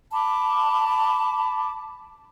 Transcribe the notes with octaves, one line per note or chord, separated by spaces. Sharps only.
A5 B5 D6